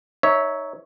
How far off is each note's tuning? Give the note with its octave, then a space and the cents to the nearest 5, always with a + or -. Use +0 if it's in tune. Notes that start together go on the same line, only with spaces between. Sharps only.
D#4 +0 C#5 +10 E5 -20